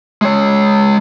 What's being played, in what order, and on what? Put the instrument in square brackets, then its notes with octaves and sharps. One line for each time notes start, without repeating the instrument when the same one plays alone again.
[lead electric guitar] G#3 C#5